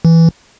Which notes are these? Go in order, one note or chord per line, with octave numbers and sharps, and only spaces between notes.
E3